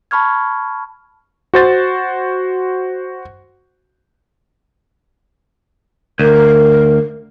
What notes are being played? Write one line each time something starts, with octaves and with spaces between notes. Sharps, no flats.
A5 B5 C#6 F6 G#6
F#4 C5 A6
D2 A#4